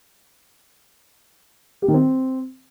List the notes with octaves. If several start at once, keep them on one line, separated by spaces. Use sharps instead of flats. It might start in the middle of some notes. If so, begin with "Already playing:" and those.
G4
D#3
C4